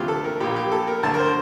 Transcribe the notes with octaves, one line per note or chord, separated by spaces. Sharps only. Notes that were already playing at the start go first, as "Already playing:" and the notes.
Already playing: D2 C3 E3 F4 G4
A4
A#4
A#1 A#2 G4
G4
A4
A#4
D2 D3 A5
A#4
C5